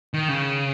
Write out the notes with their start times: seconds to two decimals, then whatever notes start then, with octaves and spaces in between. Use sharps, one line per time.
0.14 D#3
0.29 C#3